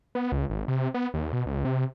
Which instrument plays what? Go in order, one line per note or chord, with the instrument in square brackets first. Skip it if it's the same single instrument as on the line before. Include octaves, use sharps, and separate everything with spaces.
[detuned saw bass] B3
C#2
G#1
C3
B3
D#2
B2
C#2
C3